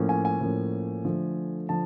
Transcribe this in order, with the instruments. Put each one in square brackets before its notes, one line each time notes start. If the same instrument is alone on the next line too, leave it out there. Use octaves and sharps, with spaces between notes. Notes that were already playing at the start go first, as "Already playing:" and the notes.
Already playing: [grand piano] A2 F3 A#3 C#4
G#5
G#5
A2 F3 A#3 C#4
D3 F3 A3
D3 F3 A5